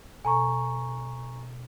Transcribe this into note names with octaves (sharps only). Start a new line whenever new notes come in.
B2 A4 G#5 A#5 C#6